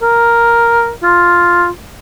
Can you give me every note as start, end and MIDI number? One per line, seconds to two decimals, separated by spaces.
0.02 0.91 70
1.03 1.68 65